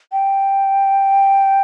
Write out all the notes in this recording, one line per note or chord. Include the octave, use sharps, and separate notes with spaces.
G5